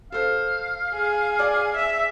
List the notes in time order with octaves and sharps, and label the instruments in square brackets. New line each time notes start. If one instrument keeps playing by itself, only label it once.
[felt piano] A4 C5 [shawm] F5
[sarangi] G#4
[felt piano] D5 G#5 D6
[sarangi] E5